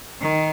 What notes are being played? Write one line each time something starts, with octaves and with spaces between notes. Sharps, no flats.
D#3